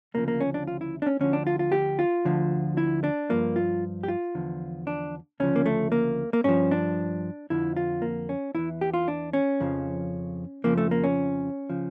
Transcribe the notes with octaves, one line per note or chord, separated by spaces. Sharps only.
D2 C#3 F3 A#3
A#3
C#4
D4
F4
E4
D4
C#4
D2 D3 F3 C#4
D4
F4
F4
G4
F4
D2 D3 F3
E4
D4
G2 F3 A#3
F4
G4
F4
E2 D3 F3
D4
D2 C#3 F3 C#4
A#3
A3
A#3
A#3
G2 F3 C#4
D4
F2 D3 F3 E4
F4
A#3
C#4
E2 E3 E4
G4
F4
D4
C#4
F2 C#3 F3
F2 C#3 F3 A#3
A3
A#3
C#4
C#3 F3